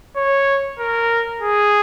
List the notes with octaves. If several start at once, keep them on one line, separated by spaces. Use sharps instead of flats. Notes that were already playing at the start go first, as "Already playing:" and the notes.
C#5
A#4
G#4